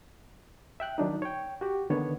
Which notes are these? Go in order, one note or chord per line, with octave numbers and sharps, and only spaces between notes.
E5 G5 F#6
D#3 F#3 D4 D#4
C#5 G5
F#4 G4
D3 D#3 B3 D4 C#5